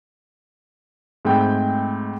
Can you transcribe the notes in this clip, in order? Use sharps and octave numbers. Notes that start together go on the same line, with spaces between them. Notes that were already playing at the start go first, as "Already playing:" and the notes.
G#2 G#3 A3 C4 G5 B5